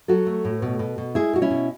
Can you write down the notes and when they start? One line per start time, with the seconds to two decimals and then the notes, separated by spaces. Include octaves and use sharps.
0.08 F#3 F#4 A4
0.27 A3
0.45 A2
0.62 B2
0.79 B2
0.98 B2
1.15 G#3 E4 G#4
1.33 B2 F#4
1.42 C#4 E4
1.51 B2